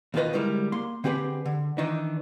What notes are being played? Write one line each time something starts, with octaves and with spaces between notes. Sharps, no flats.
D#2 B2 D#3 F4 B4 D#5
D2 G3 G#3 E4 A#4
A#3 C6
D3 C4 G4 G#4 B4
D3
D#3 E3 D4 D#4